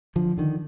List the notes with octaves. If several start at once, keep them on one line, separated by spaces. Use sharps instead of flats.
D3 F3
D3 D#3